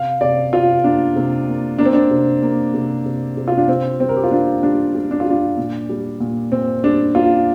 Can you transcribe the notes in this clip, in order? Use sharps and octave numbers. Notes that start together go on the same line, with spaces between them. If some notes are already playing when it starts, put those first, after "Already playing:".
Already playing: C3 F5
C3 D5
C3 F4
A#3 D4
C3
A#3
A#3 D4
C4
D4
C3
A#3
C3
C3
C3
F4
D4
C3 C4
G3 C4
A#4
G4
F4
A#3 D4
G3 D4
G3
D4
F4
G3 D4
A#2
G3
A#2
A#2 C4
G3 D4
A#3 F4